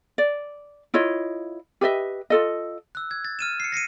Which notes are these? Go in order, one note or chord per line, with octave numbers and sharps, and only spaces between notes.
D5
E4 F4 C#5 D#5
G4 B4 D#5 E5
F4 A4 D#5
E6 F#6
G#6
A6
F6 D#7 E7
C7 C#7
A#6 C7 C#7 D#7